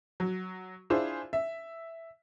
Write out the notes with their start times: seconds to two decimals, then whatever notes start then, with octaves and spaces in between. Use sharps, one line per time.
0.20 F#3
0.90 D4 E4 F4 G#4 C5
1.33 E5